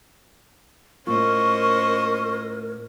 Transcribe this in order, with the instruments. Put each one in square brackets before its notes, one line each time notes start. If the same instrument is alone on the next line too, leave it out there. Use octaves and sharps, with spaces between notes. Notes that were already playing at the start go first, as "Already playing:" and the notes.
[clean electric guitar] A2 A#3 F4 [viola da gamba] C#4 C5 D#5 [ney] A#4 [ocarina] C#6